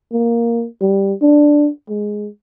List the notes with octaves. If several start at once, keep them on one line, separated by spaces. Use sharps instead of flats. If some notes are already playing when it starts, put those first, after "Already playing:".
A#3
G3
D4
G#3